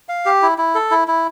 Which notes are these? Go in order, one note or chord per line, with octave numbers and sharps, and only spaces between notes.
F5
G4
E4
E4
A4
E4
E4